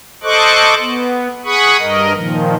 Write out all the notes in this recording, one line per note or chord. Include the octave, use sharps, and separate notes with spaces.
A4 C5 D#5 C#6 D6 F#6
B3
G#4 F#5 B5 C#6 D#6
G2 A#4 D#5
A#2 D#3 F3